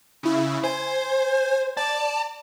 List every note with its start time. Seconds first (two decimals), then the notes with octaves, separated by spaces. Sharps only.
0.23 C#3 E4
0.64 C5 G#5
1.77 D5 A5